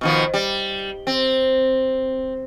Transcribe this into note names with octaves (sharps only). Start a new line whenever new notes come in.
B2 D#3 F3
G3
C4